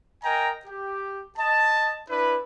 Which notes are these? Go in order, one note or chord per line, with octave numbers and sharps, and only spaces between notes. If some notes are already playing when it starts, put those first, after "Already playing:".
A#4 D#5 G5 G#5 A#5
G4
D#5 A5
D4 E4 B4